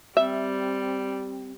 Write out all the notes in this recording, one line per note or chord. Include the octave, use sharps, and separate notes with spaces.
G3 C4 E5